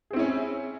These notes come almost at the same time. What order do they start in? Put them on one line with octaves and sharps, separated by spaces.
G#4 C4 E4 C#4